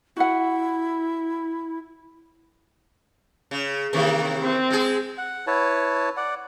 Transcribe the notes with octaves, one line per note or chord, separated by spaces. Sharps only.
E4 F#4 F#5
C#3
C3 D#3 E3 A#3
C4
G#3 G#4
F#5
E4 B4 C#5 A5
D5 F#5